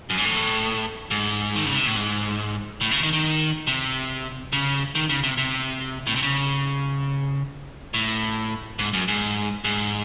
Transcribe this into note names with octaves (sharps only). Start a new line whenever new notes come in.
F#2
G#2
A2
G#2
D#3
C#3
C3
A2
G#2
A2
C#3
D#3
D#3
C3
C#3
D#3
C#3
C3
C3
A2
C3
C#3
A2
G#2
F#2
G#2
G#2